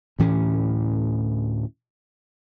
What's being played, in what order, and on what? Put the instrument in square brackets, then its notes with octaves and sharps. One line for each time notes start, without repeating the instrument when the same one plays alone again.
[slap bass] D2 A2 E3 C#4